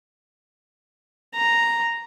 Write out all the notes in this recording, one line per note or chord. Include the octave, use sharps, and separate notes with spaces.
A#5